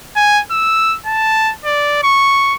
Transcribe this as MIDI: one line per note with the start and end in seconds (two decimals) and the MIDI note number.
0.16 0.41 80
0.51 0.97 88
1.06 1.52 81
1.65 1.99 74
2.03 2.55 85